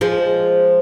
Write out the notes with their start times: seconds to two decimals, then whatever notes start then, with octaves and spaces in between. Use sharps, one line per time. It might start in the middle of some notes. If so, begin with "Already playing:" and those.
0.01 F3 G#3